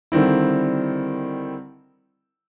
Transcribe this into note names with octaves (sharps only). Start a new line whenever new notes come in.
D3 D#3 G3 C4 E4